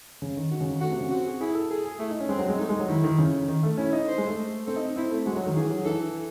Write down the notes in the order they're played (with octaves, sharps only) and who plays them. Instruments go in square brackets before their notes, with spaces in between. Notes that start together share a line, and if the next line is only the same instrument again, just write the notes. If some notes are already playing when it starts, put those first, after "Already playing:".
[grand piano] C#3
D#3
[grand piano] D#3 [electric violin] F#4
[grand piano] C#3
D#3
[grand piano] A3 [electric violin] F#4
[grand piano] C3
C#3
[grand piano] C4 [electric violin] F#4
[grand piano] G#4
[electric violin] E4 [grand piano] G#4
[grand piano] A4
[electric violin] G#4 [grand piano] A4
[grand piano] G#4
[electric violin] A3 [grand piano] E4
[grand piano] D#4
C#4
[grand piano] G#3 [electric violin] C4
[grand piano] F#3
G#3
[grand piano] A3 [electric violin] D#4
[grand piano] G#3
F#3
[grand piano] D#3 [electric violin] E4
[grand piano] D#3
C#3
D#3
A3
[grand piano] C#4 [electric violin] E4
[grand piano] D#4
[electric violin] C5
[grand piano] G#3
A3
[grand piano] C4 [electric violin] A4
[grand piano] D#4
[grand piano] C4 [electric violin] E4
[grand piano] A3
[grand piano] G#3 [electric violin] F#4
[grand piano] F#3
D#3
[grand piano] E3 [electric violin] G#4
[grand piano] F#3
[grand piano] E3 [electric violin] A4